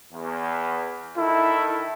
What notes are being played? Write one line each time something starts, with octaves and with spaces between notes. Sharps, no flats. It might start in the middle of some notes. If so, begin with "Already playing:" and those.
E2
D#3 E4 A4